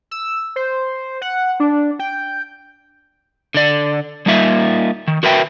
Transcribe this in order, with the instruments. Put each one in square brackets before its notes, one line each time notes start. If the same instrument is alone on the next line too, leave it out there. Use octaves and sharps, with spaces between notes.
[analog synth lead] E6
C5
F#5
D4
G5
[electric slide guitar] D3 D5
G3 A#3 D#4 F4 E5
D#3
F#4 A#4 B4 E5 F#5 G5